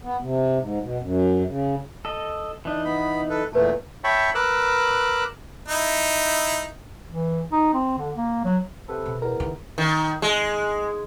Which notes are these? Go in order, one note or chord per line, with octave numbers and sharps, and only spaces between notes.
B3
C3
G#2
B2
F#2
C#3
A4 D#5
E3 D4 D#4
B3 B5
A4 B4
E2 A#2 A3 B4 A5
C#5 E5 G5 A5 B5 C#6
A#4 B4 D6 E6 F#6
D#4 E4
E3
D#4
C4
D3
A#3
F#3
C3 A4 B4
B2
E2 A#4
D#3
D#3
G#3